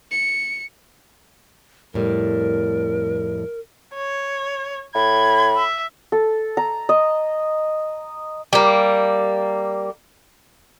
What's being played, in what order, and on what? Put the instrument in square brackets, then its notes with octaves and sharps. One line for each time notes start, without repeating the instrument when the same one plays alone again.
[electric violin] C#7
[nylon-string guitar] F2 A2 G3 [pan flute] A#4
[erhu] C#5
[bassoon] A2 [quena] B5 [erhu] G#6
[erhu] E5
[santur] A4
A#5
D#5
[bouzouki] G3 A#3